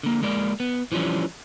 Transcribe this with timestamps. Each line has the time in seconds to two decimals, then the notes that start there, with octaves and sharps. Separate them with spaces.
0.03 D3 A#3
0.23 G#3 A#3 D5
0.60 B3
0.92 E3 F3 G3 C#4 D4